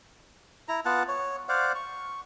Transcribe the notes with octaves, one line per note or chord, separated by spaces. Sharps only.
E4 A#5
B3 F4 F#5 A5
C#5
C5 D5 F5 F#5
C#6